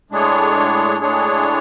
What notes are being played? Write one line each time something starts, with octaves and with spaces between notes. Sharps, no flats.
A2 G#3 D4 G#4 C#5
A2 G#3 D4 G#4 C#5